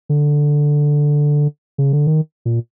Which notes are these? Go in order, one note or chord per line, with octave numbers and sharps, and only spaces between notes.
D3
C#3
D3
D#3
A#2